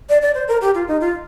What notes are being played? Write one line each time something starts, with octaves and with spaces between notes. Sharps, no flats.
D5
D5
C5
A#4
G4
F4
D#4
F4